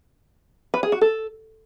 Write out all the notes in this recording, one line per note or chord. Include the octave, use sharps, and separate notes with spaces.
B4
G#4
F#4
A4